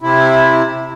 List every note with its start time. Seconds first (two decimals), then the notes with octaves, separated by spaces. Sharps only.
0.01 C3 E4